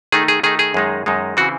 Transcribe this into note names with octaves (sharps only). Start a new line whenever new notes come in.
D#3 A3 D#4 G#4
G#4
D#3 A3 D#4 G#4
G#4
F#2 D#3 G#3 D#4
F#2 D#3 G#3 D#4
C#3 E3 C4 F#4